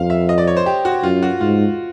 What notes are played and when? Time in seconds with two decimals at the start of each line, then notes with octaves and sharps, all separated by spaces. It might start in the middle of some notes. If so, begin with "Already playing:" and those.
Already playing: F2 F5
0.10 E5
0.29 D#5
0.38 D5
0.47 C#5
0.57 C5
0.66 G4
0.85 F#4
1.03 F#2 F4
1.23 F#4
1.40 G#2 F4